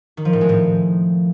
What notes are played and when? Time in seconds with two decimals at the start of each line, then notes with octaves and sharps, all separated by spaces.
0.17 D#3
0.25 F3
0.33 A2
0.41 G#3
0.49 A2